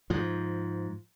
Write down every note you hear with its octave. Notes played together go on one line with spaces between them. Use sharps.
G#2 F3